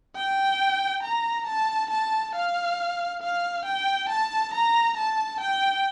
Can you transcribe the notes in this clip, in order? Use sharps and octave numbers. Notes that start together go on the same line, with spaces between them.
G5
A#5
A5
A5
F5
F5
G5
A5
A#5
A5
G5